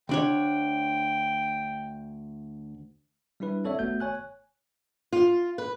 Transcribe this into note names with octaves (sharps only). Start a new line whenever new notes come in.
D2 D4 C#5 G5
G3 D4 E4 B4
C4 A4 C#5 D5 E5
G1 A3 B3 F#4 G6
C#5 G#5 F#6
F4
B4